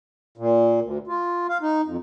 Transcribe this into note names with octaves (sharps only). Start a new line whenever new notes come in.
A#2
D2
F4
F5
D#4
F2